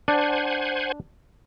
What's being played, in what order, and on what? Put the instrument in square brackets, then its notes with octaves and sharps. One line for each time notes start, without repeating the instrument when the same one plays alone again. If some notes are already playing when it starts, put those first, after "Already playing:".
[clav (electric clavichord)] D4 [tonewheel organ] C5 F#5 G#5